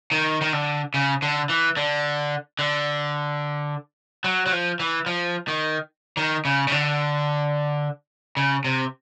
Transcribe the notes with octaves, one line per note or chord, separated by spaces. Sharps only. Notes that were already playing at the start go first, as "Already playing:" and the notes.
D#3
D#3
D3
C#3
D3
E3
D3
D3
F#3
F#3
F3
E3
F3
D#3
D#3
C#3
C#3
D3
C#3
C3